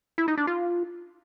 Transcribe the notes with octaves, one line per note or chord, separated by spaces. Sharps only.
E4
D#4
D4
F4